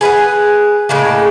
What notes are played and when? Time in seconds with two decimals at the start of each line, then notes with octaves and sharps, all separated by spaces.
0.01 G#4 B4 E5 F#5
0.89 A2 C#3 G#3 A#3